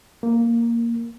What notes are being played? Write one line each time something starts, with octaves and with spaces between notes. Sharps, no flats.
A#3